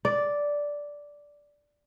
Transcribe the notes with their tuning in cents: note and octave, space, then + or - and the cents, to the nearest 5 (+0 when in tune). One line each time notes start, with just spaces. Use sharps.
D5 -5